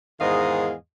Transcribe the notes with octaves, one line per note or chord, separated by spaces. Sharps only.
E2 G#2 D#3 G#4 D#5 F5